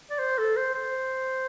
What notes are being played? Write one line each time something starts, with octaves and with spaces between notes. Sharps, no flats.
D5
C5
A4
C5
C5